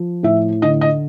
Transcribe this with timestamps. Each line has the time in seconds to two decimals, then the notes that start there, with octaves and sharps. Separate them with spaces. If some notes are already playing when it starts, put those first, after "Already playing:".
Already playing: F3
0.23 A2 E5
0.62 D3 D#5
0.81 D#5